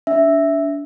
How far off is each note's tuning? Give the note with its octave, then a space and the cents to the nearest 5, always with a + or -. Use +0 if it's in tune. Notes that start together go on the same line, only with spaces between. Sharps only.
D4 -30 E5 +0